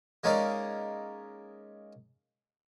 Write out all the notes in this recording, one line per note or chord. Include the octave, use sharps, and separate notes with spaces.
G#3 A#3 C#4 D#4 D5 F5